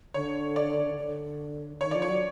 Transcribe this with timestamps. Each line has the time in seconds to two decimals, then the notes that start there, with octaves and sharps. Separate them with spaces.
0.14 D3 C#5
0.56 D5
0.98 D3
1.81 D#3 C#5
1.91 F3 D5
2.02 C#5
2.09 F#3